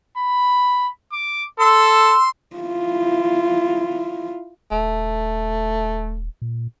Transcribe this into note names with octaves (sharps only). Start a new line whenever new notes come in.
B5
D6
A4 C6 E6
E4 F4
D#1 A3
A#2